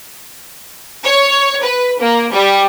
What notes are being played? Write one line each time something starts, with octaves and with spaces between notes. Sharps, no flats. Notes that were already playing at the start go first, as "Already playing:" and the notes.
C#5
B4
A#3
G3